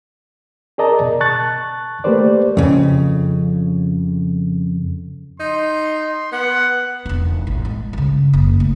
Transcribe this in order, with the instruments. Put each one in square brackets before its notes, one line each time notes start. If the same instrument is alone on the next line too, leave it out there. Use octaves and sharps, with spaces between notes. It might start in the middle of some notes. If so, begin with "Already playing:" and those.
[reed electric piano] G#4 A#4 D5 D#5 A5 A#5
B2
A5 C#6 F#6 A6
A3 A#3 G4 B4 C5 D5
[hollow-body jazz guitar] F2 C#3
[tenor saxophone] D#4 [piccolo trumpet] C6
[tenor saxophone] B3 [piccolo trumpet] F#5
[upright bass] E1 D#4
A1
G#3
G2 C#3
F#1
A3